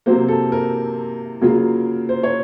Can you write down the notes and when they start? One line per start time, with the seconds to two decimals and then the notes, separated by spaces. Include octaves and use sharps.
0.06 C3 F#3 A#3 C5
0.28 A4
0.52 A#4
1.42 C#3 F#3 A#3 F4
2.09 C5
2.23 C#5